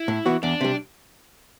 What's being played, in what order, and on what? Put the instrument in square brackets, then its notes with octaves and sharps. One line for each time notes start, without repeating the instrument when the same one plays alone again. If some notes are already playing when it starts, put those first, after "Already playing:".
Already playing: [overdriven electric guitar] E4
[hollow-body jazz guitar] A2
E3 B3 F#4
[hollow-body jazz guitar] E2 [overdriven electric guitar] D4
[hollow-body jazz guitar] C3 G3